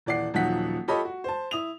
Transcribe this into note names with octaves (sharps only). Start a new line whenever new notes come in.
D#1 E3 D5 F#5 C7
D#1 F3 F#3 D#4 F#5 B6
F4 G4 A4 C#5 D#5 B5
F#4
C5 A5
E4 D#6 F7